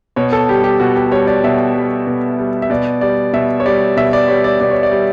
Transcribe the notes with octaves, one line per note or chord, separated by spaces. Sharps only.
B2 C#5
A4
G3 G4
G4
B2 F#4
G4
G3 C#5
D5
B2 E5
G3
B2
G3
E5
B2 D5
G3 D5
B2 E5
C#5
G3 D5
B2 E5
D5
G3 C#5
D5
B2 D5
C#5
D5
G3